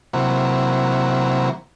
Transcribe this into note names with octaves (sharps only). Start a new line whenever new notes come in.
C3 E3 F#3 A#3